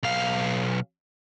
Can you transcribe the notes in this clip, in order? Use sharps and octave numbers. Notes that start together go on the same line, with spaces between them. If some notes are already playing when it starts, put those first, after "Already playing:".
B1 F5